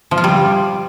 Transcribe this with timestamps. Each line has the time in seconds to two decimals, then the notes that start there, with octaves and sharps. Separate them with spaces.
0.11 F3
0.18 F4
0.24 G3